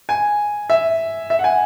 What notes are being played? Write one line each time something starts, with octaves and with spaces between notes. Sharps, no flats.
G#5
E5
E5
F#5
G#5